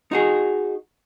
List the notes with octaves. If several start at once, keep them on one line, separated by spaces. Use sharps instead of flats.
D#4 F#4 G#4